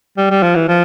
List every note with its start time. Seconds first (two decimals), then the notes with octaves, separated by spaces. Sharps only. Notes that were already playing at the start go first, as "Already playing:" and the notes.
0.17 G3
0.31 G3
0.43 F3
0.56 E3
0.68 F3